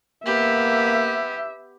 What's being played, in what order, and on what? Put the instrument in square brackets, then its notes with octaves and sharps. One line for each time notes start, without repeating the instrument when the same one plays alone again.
[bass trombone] A#3 [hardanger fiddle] B3 G4 [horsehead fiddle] E5